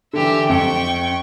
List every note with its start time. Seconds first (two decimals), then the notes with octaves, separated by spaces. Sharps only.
0.13 D3 E3 G4 E5
0.49 F2 G5 C#6